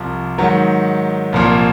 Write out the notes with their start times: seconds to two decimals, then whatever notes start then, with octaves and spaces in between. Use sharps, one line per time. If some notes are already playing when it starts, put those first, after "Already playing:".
Already playing: C2 C3 F3
0.38 G#2 D#3 F#3
1.32 C2 A#2 F3